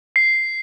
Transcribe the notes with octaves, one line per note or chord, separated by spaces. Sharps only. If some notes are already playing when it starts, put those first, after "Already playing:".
C7